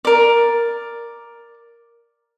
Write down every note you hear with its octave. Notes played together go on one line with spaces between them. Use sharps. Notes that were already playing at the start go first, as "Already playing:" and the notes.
A#4 D5